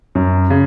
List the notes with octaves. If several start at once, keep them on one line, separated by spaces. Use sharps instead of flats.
F#2
C#3